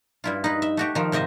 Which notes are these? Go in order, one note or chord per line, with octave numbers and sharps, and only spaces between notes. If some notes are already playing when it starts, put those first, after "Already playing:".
G2 E4 F4
D#4 B4
E5
A3 F#4 G4
D#3 F3
G#2 C3 C4 D#5 E5